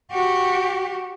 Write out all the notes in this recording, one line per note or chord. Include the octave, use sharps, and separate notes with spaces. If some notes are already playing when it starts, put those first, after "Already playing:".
F#4 G4